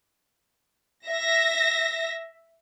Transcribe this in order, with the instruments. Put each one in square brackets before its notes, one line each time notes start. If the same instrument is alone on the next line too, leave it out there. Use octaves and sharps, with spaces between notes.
[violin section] E5 A#6